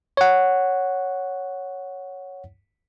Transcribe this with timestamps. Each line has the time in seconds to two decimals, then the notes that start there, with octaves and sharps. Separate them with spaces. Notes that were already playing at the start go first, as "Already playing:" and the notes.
0.17 C#5 F#5